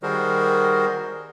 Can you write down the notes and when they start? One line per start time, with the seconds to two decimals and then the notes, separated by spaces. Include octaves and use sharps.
0.03 D#3 G3 F#4 G#4 A#4 C5